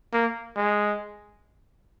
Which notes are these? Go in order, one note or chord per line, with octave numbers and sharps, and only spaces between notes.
A#3
G#3